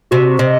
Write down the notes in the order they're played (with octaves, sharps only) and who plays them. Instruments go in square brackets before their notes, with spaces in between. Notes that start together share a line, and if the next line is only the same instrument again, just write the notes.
[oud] C3 [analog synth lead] F#4
[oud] C3 [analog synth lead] D#5